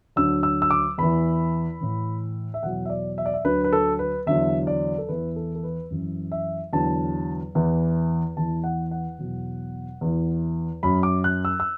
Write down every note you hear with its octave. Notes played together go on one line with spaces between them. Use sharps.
D2 D3 F#3 E6
E6
E6
D6
E2 E3 B5
A2 E3
E5
E2 B2 F#3 F#5
E5
D5
E5
D5
E5
D2 D3 F#3 B4
B4
A4
B4
E2 D3 F#3 E5
D5
A4
E2 E3 B4
A4
A4
B4
F#2 E3
E5
E2 D3 F#3 A5
E2 E3
E2 E3 A5
F#5
F#5
E2 B2 F#3
E2 E3
F#2 F#3 B5
D6
F#6
E6
E6